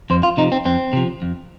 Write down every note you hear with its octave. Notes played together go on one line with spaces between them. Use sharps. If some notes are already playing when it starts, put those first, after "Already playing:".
F2 C5
F4
C3 F3 D#4
C4
F2 C4
C3 F3
F2